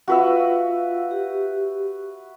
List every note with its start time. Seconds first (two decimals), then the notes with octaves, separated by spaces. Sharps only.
0.08 F4 F#4 B4 E5 F5
1.11 G4